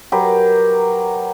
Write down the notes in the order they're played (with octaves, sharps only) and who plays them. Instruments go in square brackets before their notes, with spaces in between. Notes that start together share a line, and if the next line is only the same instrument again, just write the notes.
[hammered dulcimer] F#3 G4 A#4 B4